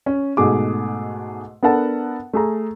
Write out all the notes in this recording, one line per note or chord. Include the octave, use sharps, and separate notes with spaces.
C#4
G#2 B2 A3 G#4 D6
B3 D4 A4 A#4 F#5 A5
A3 G#4 A#5